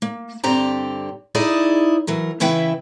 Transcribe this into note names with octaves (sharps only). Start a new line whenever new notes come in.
A#3
G2 D3 C4 G4 D5 A#5
D#4 E4 G#4 D5
E3 F#3 A#4
C#3 E3 E4 B4 E5 G5